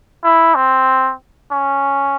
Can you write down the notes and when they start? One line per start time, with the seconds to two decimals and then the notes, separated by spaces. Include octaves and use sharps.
0.24 E4
0.55 C4
1.52 C#4